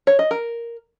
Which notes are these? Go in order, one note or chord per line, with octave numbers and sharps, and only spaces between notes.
C#5
D#5
A#4